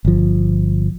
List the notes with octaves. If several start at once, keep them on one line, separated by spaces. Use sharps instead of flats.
G1 F3